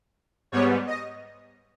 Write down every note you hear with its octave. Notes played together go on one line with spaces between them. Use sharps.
G#2 G3 B3 C#5
D#5